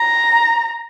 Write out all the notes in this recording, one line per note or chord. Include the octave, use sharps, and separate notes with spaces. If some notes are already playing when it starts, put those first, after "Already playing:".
Already playing: A#5